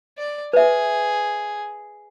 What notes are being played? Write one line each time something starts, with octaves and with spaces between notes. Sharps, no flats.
D5
G#4 B4 E5